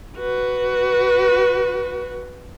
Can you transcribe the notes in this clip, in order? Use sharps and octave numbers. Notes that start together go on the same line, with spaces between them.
F#4 B4